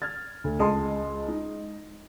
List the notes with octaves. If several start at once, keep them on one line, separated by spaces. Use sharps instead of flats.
F6 G#6 A6
D2
C#2 G#3 D#5 A5 C6
D#4